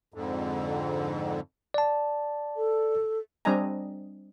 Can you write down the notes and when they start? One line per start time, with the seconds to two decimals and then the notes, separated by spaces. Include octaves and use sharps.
0.14 F2 G#2 D3
1.74 D5 A5
2.56 A4
3.45 G3 C4 D4 D#5 G#5 A#5